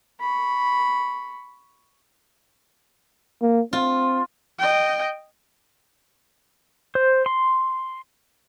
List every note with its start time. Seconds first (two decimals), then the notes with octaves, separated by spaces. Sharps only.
0.20 B5 C#6
3.42 A#3
3.73 C4 F4
4.59 D#5 G5
6.95 C5
7.26 C6